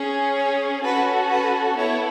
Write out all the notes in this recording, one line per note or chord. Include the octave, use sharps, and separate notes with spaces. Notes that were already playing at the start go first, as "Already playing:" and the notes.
Already playing: C#4 G#4
C#5
C#4 F#4 A4 B4
B4
B3 E4 A4 C#5